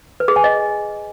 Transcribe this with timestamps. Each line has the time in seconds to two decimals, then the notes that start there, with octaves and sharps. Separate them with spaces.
0.20 B4
0.28 G#4
0.36 G#5
0.44 D#5